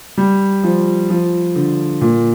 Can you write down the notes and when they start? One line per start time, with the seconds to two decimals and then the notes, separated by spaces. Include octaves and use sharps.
0.18 G3
0.63 F3
1.10 F3
1.55 D3
2.01 A#2